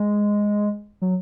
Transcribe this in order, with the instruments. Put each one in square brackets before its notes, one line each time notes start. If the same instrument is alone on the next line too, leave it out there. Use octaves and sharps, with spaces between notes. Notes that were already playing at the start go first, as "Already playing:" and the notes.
Already playing: [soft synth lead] G#3
F#3